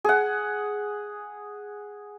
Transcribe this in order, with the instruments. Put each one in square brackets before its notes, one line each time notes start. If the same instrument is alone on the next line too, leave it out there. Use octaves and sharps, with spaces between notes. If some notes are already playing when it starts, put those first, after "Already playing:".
[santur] G#4 F#5